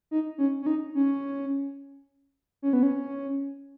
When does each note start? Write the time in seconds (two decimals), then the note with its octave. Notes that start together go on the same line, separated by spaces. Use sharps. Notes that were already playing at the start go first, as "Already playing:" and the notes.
0.11 D#4
0.38 C#4
0.62 C#4
0.66 D#4
0.95 C#4
2.62 C#4
2.73 B3
2.83 C#4